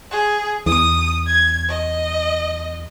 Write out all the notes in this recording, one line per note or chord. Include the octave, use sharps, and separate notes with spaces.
G#4
E2 D#6
G#6
D#5